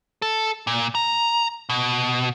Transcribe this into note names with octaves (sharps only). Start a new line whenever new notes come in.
A4
A#2
A#5
B2